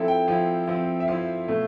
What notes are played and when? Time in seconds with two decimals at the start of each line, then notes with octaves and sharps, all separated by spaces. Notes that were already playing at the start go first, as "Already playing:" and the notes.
Already playing: F3 C4 E4 A4
0.08 G5
0.28 F3 C4 E4 F5
0.68 F3 C4 E4
1.00 E5
1.08 F3 C4 E4 F5
1.48 B2 A3 E4